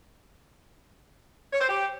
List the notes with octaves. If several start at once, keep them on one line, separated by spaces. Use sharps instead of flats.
C#5
C5
G4